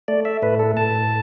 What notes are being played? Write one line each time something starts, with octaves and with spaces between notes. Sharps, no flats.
A3 D5
E5
A2 B4
A4
A2 A5